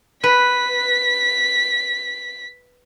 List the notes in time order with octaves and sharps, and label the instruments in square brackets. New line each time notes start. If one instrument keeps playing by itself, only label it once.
[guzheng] B4 [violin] B6